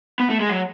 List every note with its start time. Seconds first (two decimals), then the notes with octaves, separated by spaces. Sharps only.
0.20 B3
0.30 A3
0.40 G#3
0.50 F#3